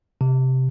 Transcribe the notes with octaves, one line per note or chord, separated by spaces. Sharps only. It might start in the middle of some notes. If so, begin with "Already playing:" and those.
C3